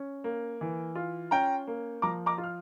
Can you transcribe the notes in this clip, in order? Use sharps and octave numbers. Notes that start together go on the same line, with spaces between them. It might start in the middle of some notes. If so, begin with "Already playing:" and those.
Already playing: C#4
A#3
E3
F4
C#4 G5 A#5
A#3
F3 A#5 D6
A#5 D6
F4
F6